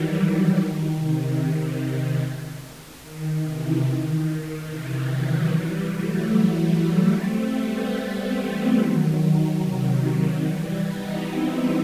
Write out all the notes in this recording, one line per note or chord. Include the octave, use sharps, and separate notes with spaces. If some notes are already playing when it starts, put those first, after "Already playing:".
Already playing: D#3 E3 F#3 G3
D#3 F#3
D#3
C3
D#3
C3 E3
D#3
C3 E3
D#3 F#3
E3 G3
F#3 A3
A3 C4
G3 B3
E3 G3
D#3 F#3
D#3
C3
D#3 F#3
E3 G3
B3 D#4
C4 E4